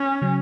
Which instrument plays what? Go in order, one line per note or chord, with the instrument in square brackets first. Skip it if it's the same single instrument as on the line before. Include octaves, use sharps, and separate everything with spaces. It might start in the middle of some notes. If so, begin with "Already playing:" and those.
Already playing: [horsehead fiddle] C#4
[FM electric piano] C#3 F#3